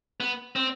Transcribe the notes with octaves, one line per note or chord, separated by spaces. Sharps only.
B3
C4